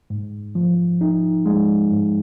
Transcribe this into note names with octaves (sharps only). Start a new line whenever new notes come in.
G#2
F3
D#4
G#3
G#2